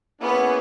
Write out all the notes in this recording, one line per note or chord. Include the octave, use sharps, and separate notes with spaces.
A#3 B3 C#4 E4 G#4